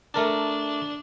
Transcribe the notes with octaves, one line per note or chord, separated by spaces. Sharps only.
A3 D4 A#4 A5